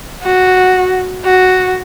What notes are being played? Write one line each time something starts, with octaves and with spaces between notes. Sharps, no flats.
F#4
F#4